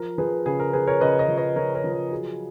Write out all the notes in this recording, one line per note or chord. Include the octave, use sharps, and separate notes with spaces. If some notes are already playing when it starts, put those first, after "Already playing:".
Already playing: F3 A#4
F3 G#4 B4
C#3 G#4
A#4
F3 G#4 B4
A#4 C#5
C#3 B4 D#5
B4 D#5
F3
B4 D#5
F3 A#4 C#5
A#4 C#5
F3
A#4
F#3 G#4